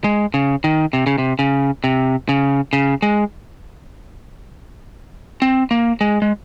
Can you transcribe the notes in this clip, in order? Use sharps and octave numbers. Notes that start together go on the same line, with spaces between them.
G#3
C#3
D#3
C3
C#3
C3
C#3
C3
C#3
C#3
G#3
C4
A#3
G#3
G#3